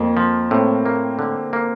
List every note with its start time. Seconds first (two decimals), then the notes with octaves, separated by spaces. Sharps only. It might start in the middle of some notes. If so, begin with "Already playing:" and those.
Already playing: F2 A#3
0.17 F3
0.51 A2 C4
0.86 A#3
1.19 D3
1.53 A#3